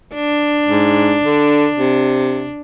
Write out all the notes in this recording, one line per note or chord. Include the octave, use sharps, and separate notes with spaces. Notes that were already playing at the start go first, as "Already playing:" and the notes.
D4
G#2
D3
C3